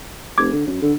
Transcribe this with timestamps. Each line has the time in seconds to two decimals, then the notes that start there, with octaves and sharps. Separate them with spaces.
0.38 F1 D6 G#6
0.52 D3
0.67 F#2
0.82 D3